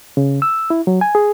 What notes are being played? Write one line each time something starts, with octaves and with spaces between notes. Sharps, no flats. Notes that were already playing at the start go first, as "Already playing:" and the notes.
C#3
E6
E4
F#3
G#5
G#4